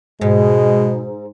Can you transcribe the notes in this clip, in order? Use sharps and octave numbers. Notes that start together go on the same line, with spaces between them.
G#2 B2 G#3